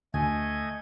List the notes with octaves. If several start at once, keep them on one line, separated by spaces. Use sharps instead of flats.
D2 A3 D#5 G#5 G#6